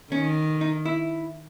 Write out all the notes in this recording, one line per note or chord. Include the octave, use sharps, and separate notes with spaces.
D#3 C#4
D#4
E4